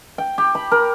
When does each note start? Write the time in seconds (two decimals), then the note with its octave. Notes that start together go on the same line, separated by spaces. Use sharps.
0.18 G5
0.38 G4
0.55 B5
0.71 A#4